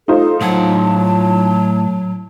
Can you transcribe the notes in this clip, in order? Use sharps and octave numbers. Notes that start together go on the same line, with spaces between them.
D#4 F4 A4 C5
A2 F#3 F#5 A5